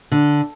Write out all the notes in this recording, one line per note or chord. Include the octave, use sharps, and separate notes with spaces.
D3